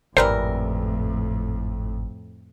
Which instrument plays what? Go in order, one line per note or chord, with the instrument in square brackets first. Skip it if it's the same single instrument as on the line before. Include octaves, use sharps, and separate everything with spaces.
[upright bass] G#1 [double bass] F2 A2 [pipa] E3 G3 A#4 [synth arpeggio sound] C5